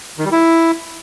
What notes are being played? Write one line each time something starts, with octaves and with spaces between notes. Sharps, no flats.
D#3
G3
E4